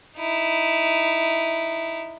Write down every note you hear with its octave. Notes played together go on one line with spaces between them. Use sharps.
D#4 E4